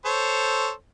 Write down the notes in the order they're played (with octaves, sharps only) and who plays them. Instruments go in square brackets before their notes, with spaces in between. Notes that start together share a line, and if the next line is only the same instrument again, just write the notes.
[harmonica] A4 C5 C#5